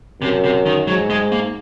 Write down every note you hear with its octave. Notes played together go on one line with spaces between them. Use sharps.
F#2 C3
C3
D#3
G#2 F#3
G#3
A#3